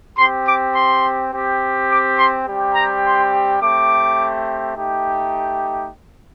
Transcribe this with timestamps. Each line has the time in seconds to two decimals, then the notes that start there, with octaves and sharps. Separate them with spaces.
0.16 C4 G4 C6
0.45 D6
0.74 C6
1.31 C4 G4
1.89 D6
2.17 C6
2.46 G3 C4 G4
2.74 A#5
3.03 C6
3.60 A3 C4 G4 D6
4.75 A3 D#4 G4